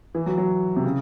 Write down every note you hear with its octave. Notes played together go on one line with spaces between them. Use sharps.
E3
F#3
F#3
C3
C#3